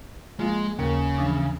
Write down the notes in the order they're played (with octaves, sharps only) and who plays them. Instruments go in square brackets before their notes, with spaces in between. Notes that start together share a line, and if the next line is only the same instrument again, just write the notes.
[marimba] F3 A#3 F4 [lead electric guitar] G#3
[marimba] D#2 A#3 A#4 [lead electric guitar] C#3
[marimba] E3 F3 D4